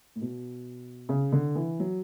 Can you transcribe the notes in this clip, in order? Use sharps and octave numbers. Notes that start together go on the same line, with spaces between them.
A2
B2
C#3
D3
E3
F#3